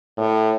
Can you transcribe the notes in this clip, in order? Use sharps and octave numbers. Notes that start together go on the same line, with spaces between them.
A2